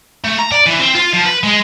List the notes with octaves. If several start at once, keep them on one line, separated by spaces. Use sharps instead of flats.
A3
A#5
D5
E3
C4
F4
F3
B4
G#3